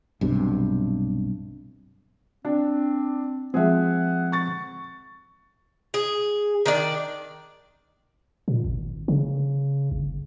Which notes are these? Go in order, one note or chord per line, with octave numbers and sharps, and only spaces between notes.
B1 G2 C3
C4 D4
F3 G#3 C4 G#4 E5 F#5
C#6 A6
G#4
D#3 D4 D5
A#2
G#1
C#3
G1